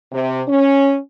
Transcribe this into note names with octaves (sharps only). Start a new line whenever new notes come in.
C3
C#4